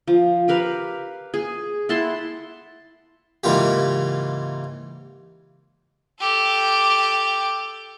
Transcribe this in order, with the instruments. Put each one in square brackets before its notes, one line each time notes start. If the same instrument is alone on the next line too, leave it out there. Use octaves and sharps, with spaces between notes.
[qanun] F3
G4 A#4 B4 F5
G#4
E4 F#5 A5 C6
[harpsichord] G#2 C#3 E3 A#3 F4 G4
[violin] G4 A4